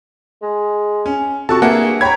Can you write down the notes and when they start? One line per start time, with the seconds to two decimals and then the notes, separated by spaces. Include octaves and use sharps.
0.42 G#3
1.06 C#4
1.49 C3 F#4 A4 A5 C#6
1.62 G2 A#3 G#4 E5 F#5
2.01 C#5 G5 A#5 B5 G#6